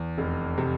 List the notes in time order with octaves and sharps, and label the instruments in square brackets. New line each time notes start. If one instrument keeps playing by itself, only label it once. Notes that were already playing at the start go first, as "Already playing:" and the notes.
Already playing: [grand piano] E2
F1
C3